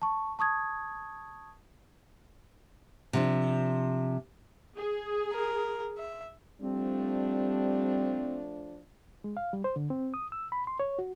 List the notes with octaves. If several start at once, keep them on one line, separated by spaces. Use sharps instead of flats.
A5 C#6
A5 C#6 D#6 G#6
C3 F3 D4
G#4
A#4
E5
F3 G3 A3 C4 D4
G#3
F5
G3
C5
D3
C4
D#6
E6
B5
C6
C#5
F#4